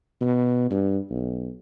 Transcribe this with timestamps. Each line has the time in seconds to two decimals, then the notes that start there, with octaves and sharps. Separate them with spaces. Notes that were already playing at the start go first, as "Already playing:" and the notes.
0.21 B2
0.71 G2
1.10 B1